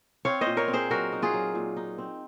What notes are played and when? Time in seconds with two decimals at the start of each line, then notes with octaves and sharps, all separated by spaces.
0.25 C4 C#5 F5
0.41 C5 D#5
0.47 A#2
0.57 A#4 C#5
0.68 C4
0.73 G#4 C5
0.90 F#3 F#4 A#4
1.12 D#4
1.22 F4 G#4
1.34 F#3
1.55 A#2
1.76 D#4
1.98 C4